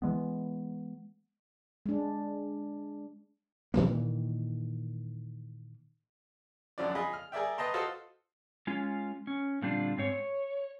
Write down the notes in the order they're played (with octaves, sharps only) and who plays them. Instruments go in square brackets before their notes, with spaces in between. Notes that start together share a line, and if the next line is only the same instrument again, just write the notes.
[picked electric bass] E3 G#3 B3
[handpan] G#3 D4
[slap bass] A#2 D#3 E3 A#3
[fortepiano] G#1 F#2 F3 D4 D5
F4 G#4 D#5 B5
F6
G#4 A#4 D5 E5 G5
B4 D#5 G5 A5 A#5 C6
F4 F#4 A4 C5 D#5 F5
[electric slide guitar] G#3 C#4 F4
C#4
A#2 D3 G3 C4 D4 F4
G#2 C4 C#5
C#5